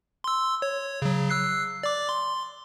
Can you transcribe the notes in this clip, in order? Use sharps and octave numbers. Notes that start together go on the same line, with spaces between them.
C6 E6
C#5
C#3 F#3
E6 F#6 C7
D5 D6
C6